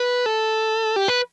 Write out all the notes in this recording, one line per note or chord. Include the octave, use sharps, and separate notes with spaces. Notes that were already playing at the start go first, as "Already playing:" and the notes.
Already playing: B4
A4
G4
B4